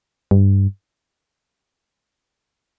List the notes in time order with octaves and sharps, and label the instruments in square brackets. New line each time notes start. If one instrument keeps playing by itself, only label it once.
[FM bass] G2